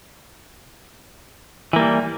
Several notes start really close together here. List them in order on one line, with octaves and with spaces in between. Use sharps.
E3 A#3 G3